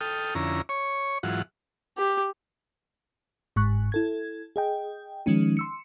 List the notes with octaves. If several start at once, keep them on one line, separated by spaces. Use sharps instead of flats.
A4 G5 D#6 F6
F2 D3 C#4 E4 A#5
C#5 C#6
G#2 E3 F#3 F4 F#5
G4
G1 G#2 C#6 F#6
E4 A4 G#6
G#4 D#5 G5
D#3 F3 G#3 C#4 D#4
C6 E6 C#7